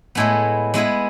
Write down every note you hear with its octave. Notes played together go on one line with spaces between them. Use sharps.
A2 G#3 B3 E4 A4
G#3 B3 E4 G#4